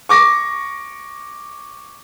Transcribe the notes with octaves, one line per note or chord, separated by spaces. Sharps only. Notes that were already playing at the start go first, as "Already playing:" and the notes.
C#6 D6 A#6